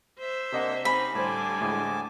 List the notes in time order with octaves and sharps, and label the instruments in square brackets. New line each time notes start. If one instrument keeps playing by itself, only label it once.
[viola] C5 E5
[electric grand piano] C3 D#5 F#5 [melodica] A#3 D4
[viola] C4 D#4 [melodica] C#4 G4 [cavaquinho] B5
[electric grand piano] A2 C5 [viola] D3 G3 [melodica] G#5 A5 D6
[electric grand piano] D2 A2 G#3